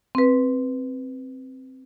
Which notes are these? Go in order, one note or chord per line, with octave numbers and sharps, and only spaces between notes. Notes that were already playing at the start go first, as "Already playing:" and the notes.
C4 B4